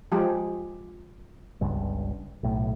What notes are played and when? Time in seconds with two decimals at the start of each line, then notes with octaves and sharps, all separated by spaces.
0.12 F3 G#3 G4
1.61 G1 C#2 G2
2.43 B1 A2